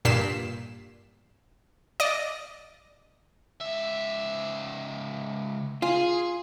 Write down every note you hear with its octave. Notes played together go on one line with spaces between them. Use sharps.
G2 A#2 B6 C7 E7
D5 D#5
C#2 E5
F4 G#4